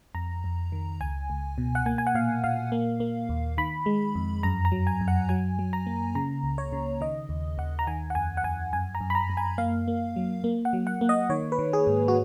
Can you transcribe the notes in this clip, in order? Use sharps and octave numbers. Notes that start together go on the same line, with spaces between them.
F2 A#5
F2
D#3
C#2 G#5
C#2
B2
F#5
A#3 G#5
G#5
F#5
A#2 F5
A#2 F5
A#3
A#3
D#2
D#3 B5
G#3
F2
F#2 A#5
A#5
F#3
G#5
F#2
F#5
F#3 G#5
F#3
A#5
A#3
C#3 A#5
C#2
C#5
C#3
D#3 D#5
D#2
D#2 F#5
A#5
D#3 G#5
F#5
F2 G#5
F#5
F2 G#5
F#2 G#5
A#5
F#2
B5
A#5
F#2
G#5
A#3 F5
A#3
F#3
A#3
F#5
F#3
F#5
A#3
D#5
D#3 C#5
B4
D#3
G#4
G#2
F#4